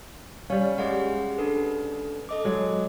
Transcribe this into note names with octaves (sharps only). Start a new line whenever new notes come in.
G3 C#4 F5
G#3 G4 G#4 F#5
D4 A4 B4
A4 D#5 D6
F#3 G#3